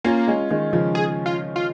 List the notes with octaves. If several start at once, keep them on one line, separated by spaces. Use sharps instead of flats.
A#3 C#4 F4
G#3 C#4
D#3 G#3
C#3 F3
G#4
F4
F4